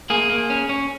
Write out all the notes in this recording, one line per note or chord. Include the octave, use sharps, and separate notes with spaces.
A#3 G#4
A#3
C#4
C#4